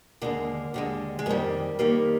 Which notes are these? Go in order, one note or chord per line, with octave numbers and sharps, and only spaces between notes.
D#2 D3 G#3 A#3
D#2 D3 G#3
G#3
F2 D#3 G3 A#3
F2 D#3 G3 A#3